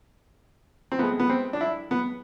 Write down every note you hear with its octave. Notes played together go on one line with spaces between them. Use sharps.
C4
A2 G#3 B3
B3
C4
D4
E4
B3